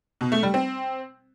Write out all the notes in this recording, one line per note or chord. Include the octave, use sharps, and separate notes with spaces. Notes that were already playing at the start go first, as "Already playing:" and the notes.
B2
A3
G3
C4